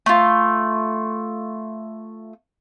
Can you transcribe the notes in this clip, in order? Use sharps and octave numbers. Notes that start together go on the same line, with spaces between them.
A3 F4